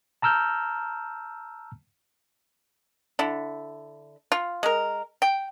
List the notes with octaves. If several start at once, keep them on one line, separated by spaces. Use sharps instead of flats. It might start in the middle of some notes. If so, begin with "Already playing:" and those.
A5 A#5 E6 F6 G6
D3 E4
F4
G#3 A#4
G5